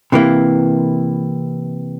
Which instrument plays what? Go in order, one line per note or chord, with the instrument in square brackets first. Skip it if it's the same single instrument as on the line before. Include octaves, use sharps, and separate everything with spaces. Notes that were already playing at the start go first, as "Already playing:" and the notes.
[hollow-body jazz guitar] C3 E3 A#3 E4